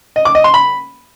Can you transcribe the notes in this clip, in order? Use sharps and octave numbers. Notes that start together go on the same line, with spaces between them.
D#5
D6
D#5
C6
B5